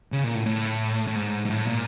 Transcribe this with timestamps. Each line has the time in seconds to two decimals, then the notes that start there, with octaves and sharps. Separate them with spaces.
0.12 C#3
0.24 A#2
0.34 A2
0.46 A2
1.07 A2
1.15 G#2
1.45 G#2
1.50 A2
1.67 A#2